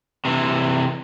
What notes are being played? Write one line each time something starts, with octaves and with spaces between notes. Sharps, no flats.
C3 E3